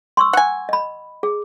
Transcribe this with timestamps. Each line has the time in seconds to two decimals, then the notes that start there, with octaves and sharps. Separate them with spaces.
0.17 C6 C#6 E6
0.33 F#5 G#5
0.69 D#5 B5
1.23 G#4